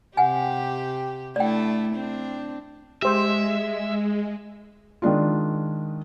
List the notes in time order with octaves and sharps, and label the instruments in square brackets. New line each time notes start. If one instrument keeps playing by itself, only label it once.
[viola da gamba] C3 G4 [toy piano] F#5 G#5
[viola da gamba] A3 D4 E4 [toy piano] D5 G5
[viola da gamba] C4 D4
[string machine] G#3 [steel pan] G4 C5 E6 [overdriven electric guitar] E5
[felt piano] D#3 G#3 D4 F4